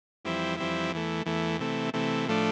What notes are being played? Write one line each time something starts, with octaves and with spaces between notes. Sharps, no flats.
F2 E3 G3 C4 E4
F2 E3 G3 C4 E4
E2 E3 A3
E2 E3 A3
C3 E3 A3
C3 E3 A3
A2 F3 A3 D4